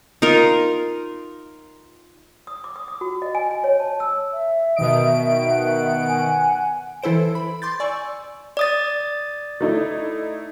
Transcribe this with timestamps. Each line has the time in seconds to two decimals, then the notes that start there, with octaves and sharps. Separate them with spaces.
0.22 D#4 F4 A#4
2.47 D#6
2.64 D6
2.76 D#6
2.88 D#6
3.01 F#4
3.22 D#5
3.35 G#5
3.51 G#5
3.64 C#5
3.80 A5
4.00 E6
4.33 E5
4.76 B2 D#3 D#5 D7
5.51 F#5
6.09 G#5
7.03 E3 E4 A4 C5 D7
7.35 B5
7.62 C6 D6 G6 A6
7.80 D5 G#5 C#6 E6
8.57 D5 D#6 A6
9.61 A3 D#4 E4